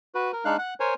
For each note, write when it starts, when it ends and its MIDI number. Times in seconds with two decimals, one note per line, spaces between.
0.15 0.32 66
0.15 0.32 71
0.33 0.44 70
0.45 0.57 56
0.45 0.57 62
0.45 0.57 63
0.45 0.57 77
0.45 0.57 90
0.59 0.74 78
0.59 0.74 90
0.80 0.94 70
0.80 0.94 72
0.80 0.94 73
0.80 0.94 80